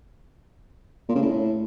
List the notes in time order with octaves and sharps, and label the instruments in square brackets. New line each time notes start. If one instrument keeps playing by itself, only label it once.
[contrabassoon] A#2
C#3
A2